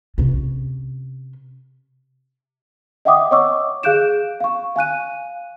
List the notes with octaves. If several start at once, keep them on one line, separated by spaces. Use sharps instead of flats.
C3 C#4
D#5 E5 F#5 G5 D6 D#6
C#5 D#5 F#5 C#6 D6 E6
G#4 F5 F#6 G6 D7 E7
F5 C#6
F5 G#5 F#6 D#7